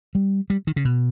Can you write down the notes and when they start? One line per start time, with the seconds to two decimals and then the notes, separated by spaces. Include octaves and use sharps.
0.15 G3
0.50 G3
0.67 D#3
0.76 C#3
0.85 B2